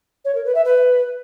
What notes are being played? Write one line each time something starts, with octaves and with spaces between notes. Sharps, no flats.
C#5
A#4
B4
E5
B4